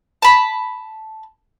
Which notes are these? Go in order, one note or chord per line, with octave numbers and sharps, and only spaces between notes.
A5 B5